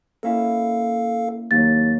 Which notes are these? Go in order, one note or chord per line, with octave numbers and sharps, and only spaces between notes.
A#3 C#4 E4 A4 F5
D#2 F#3 A#3 A6